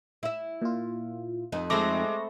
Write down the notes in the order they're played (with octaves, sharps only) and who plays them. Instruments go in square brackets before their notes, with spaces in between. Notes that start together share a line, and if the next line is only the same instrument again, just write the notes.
[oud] E4 E5
[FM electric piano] A#2 F4
[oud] F2 D#4
[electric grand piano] G#3 D6 [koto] A3 C4 C5 [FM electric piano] B5 C#6 A#6